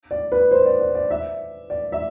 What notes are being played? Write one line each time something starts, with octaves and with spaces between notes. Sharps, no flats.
D5
B4
C5
D5
D5
D5
E5
D5
E5